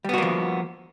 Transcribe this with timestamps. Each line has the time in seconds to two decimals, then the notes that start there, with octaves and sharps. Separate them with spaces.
0.05 G3
0.09 B3
0.13 F#4
0.18 A#3
0.22 F3